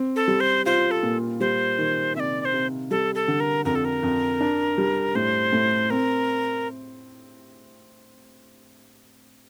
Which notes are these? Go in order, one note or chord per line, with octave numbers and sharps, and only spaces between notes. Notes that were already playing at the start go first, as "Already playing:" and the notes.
Already playing: C4
A4
G3
C5
F4 C5
A4
A#2
G3 C5
D#3
C3 D5 E5
D5
C5
C3
G3 A4
A4
D3
A#4
F2 A#4
A4
A#4
F2
D4
G3
A2 C5
A2
C4 A#4